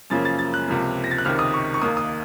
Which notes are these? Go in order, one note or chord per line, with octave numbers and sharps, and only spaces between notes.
F#2 C#3 F3 A#3 A6
A6
A6
F#6
C#2 C3 F3 A#3
A#6
A6
F#6
C#2 C3 D#3 F6
D#6
C#6
C#6
D#2 D#3 A#3 D#6
D#6